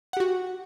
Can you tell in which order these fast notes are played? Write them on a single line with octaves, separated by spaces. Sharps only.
F#5 G4 F#4